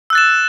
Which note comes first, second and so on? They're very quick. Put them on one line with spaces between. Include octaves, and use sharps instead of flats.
E6 F#6 A6 E7